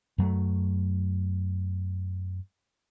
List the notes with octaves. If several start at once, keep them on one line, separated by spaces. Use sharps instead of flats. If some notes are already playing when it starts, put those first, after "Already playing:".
F#2 F#3 G3 A3